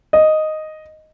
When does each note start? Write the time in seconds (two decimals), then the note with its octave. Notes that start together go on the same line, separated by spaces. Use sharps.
0.13 D#5